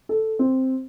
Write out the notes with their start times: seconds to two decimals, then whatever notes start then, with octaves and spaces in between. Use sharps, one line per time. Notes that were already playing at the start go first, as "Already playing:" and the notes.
0.09 A4
0.39 C4